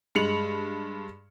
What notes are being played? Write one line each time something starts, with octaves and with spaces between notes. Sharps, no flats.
G2 G#3 C#7 F7 F#7